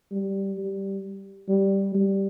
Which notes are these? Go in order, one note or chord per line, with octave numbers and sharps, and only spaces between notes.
G3
G3
G3
G3